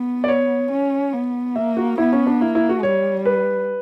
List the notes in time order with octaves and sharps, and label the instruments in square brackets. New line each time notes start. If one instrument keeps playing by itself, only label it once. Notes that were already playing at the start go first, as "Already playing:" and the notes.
Already playing: [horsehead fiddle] B3
[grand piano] D5
C#5
[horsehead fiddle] C#4
B3
[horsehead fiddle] A#3 [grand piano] E5
[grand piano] F#4
[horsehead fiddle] B3 [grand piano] E4
[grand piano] C#4
D4
[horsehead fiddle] A#3 [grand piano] E4
[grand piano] E4
F#4
[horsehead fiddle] G3 [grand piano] C#5
[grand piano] B4